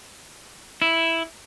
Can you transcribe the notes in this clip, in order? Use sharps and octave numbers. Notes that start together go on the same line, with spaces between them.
E4